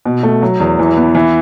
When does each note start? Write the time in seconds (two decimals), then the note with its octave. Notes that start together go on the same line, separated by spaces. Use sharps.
0.05 B2
0.23 A3
0.42 F#3
0.60 E2
0.79 E3
0.97 B3
1.15 E3